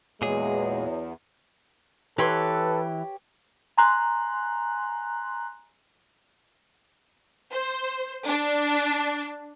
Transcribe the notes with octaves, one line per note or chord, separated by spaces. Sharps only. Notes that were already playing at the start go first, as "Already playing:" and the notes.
E2 A#2 F#3 G#3 G#4
E3 G4 A4 B4 C#5 C6
G#5 A#5 C6 F#6
C5
D4